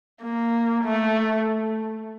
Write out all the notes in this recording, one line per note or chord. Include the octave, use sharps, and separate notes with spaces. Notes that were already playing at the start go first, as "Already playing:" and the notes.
A#3
A3